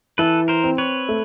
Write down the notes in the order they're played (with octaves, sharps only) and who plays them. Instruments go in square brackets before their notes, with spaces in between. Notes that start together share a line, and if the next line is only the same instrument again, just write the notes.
[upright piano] E3 [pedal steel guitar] A4 B4
[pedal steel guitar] A#4 C5
[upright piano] C4
[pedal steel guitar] B4 C#5
[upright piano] A3